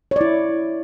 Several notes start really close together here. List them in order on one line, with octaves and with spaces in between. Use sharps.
C#5 D5 E4